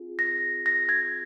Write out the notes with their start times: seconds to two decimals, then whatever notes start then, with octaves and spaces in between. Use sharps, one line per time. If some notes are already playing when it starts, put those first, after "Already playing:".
Already playing: C4 F4 G#4
0.19 A#6
0.66 A#6
0.89 G#6